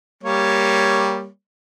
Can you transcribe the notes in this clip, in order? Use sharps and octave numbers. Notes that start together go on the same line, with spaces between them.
G3 A#3 C#5